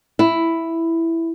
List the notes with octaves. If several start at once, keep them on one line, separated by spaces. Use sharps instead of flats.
E4